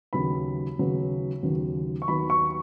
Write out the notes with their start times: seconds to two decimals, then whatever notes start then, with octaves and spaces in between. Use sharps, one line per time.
0.13 D#2 C#3 F#3 B3 B5
0.78 D#2 C#3 F#3 B3
1.43 D#2 C#3 F#3 B3
2.02 C#6
2.08 D#2 D#3 F#3 B3 B5
2.30 C#6